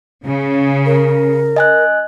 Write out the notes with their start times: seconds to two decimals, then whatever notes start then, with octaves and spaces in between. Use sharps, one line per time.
0.25 C#3
0.86 A#4
1.56 D#5 G#5 F#6